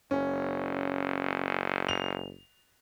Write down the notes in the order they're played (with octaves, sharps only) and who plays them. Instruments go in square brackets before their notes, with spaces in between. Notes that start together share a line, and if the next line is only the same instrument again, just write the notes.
[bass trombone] F#1 [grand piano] C#4
[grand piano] F7